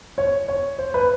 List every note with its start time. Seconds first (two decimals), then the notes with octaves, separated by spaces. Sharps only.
0.18 C#5
0.48 C#5
0.79 C5
0.94 B4